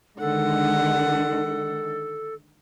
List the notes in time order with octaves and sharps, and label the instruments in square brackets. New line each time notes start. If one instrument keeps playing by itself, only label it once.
[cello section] D3 D#3 G#3 [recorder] A4 [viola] F#5